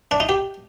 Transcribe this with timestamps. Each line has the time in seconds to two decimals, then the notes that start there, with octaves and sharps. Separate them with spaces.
0.11 D4
0.20 D#4
0.29 G4